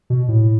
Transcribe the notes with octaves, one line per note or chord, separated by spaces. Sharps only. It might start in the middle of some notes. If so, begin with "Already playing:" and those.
B2
A2